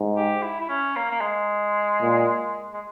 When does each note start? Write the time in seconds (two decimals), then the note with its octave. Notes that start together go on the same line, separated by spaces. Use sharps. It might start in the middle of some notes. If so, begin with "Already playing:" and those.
Already playing: G#2
0.16 G4
0.42 E4
0.60 E4
0.69 C#4
0.96 A#3
1.11 A#3
1.21 G#3
2.01 A#2
2.73 G#3